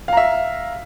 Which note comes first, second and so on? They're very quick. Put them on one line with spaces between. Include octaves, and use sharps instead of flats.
F5 A#5 E5